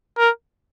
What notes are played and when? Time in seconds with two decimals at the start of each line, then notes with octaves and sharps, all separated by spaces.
0.18 A#4